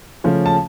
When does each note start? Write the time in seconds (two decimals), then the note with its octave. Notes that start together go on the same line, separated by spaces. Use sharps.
0.24 C#3 F3 A3 C#4
0.46 A5